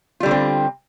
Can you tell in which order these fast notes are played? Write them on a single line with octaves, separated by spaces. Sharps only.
F4 G3 D3 B3 C4